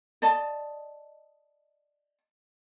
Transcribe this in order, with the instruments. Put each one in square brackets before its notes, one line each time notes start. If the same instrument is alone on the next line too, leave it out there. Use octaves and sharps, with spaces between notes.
[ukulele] D5 D#5 A5